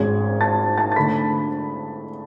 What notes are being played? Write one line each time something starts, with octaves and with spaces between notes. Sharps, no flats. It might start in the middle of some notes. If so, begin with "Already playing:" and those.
Already playing: G#1 G#2 G#3 C#4 G#6
A5 A6
A5 A6
A6
D3 A3 B5 B6